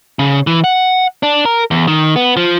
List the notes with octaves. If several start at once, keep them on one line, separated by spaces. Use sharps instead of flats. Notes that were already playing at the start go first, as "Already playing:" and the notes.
C#3
E3
F#5
D4
A#4
E2
D#3
B3
F3